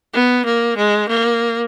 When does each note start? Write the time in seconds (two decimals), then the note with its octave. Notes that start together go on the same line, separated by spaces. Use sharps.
0.13 B3
0.45 A#3
0.77 G#3
1.09 A#3